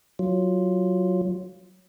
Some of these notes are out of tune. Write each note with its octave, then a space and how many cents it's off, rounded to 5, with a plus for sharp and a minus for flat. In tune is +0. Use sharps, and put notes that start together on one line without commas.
F#3 +0 F4 +0